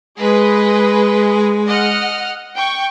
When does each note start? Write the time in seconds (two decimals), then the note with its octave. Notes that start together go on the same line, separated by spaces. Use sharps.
0.20 G#3 G#4 B4 D#5
1.67 D#5 F#5 F6
2.56 G5 C#6